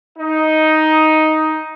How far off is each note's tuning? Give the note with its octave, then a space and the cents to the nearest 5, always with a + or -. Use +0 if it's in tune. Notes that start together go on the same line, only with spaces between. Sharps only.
D#4 +5